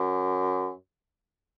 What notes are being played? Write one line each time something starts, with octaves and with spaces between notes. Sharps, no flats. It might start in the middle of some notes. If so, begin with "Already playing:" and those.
Already playing: F#2